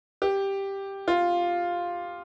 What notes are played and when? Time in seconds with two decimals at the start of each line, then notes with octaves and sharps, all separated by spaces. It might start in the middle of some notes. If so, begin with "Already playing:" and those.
0.22 G4
1.08 F4